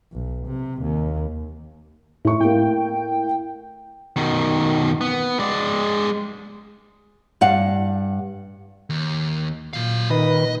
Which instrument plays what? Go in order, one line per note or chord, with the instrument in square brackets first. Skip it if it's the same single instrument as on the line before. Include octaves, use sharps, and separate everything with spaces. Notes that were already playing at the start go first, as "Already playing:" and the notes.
[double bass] B1
C3
D#2
[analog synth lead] A2 [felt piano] E4 C#6
[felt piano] A2 A#3 [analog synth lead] G5
[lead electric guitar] B2 D#3
B3
G#3 D5
[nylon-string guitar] G2 F5 F#5
[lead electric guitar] D#2
[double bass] A#2 [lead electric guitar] F#3 F5
[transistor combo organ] D#3 B4 [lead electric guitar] D#5